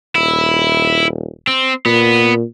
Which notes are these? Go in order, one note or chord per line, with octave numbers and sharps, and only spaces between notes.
D#1 E4
C4
A#2 B3